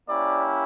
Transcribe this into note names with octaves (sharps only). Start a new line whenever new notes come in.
A#3 C#4 E4 G4 D5